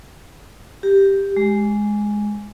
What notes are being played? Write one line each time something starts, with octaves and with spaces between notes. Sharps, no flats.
G4
G#3